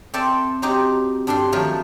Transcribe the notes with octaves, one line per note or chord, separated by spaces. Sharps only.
C4 A4 D5 E5 G5 A5
F#3 C4 D#4 G4
G2 D4 G4 A4 C6
D#3 F3 F#3 A3